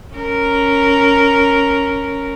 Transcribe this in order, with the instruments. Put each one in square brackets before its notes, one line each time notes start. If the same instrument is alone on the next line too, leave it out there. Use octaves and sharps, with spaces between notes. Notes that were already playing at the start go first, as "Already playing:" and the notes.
[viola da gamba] C#4 A#4